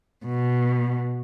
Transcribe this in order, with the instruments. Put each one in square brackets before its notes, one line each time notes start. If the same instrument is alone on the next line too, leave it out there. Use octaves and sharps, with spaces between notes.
[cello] B2